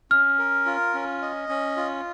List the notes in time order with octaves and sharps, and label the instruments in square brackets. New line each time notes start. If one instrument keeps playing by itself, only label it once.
[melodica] C#4 [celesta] F6
[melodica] A#4
F4
C#4
D#5
C#4
F4